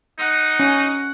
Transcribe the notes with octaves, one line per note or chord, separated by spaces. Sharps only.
D#4 F#5
C#4